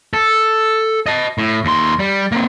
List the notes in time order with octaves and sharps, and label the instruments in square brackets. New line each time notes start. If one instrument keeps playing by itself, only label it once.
[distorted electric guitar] A4
D#5 A5
A2
D#2 C6
G3
A#3 C4